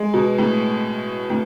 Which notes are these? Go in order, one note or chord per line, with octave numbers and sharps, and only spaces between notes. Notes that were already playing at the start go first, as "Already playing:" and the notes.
Already playing: G#3
B2
A2
A2